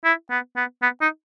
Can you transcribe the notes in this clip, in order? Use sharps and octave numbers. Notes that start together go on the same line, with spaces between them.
E4
B3
B3
B3
D#4